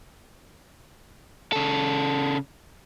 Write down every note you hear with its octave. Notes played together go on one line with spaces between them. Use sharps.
C#3 A4